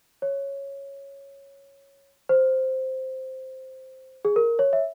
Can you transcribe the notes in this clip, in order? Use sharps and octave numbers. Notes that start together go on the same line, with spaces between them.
C#5
C5
G#4
A#4
C#5
E5